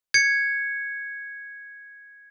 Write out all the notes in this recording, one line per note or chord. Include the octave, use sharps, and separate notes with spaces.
G#6 C#7